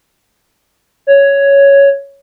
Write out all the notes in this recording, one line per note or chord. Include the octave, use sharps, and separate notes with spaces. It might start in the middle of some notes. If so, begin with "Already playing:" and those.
C#5